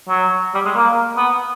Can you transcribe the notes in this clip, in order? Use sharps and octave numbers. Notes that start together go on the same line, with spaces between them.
F#3
G3
G#3
A#3
B3